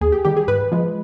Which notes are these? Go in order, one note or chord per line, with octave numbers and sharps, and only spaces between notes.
D#2 G#4
G4
D#3 G3 G4
G#4
G#2 B4
F3 G#3